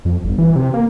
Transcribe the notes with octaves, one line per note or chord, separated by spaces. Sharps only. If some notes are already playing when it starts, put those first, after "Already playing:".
F2
G1
E3
C3
A#3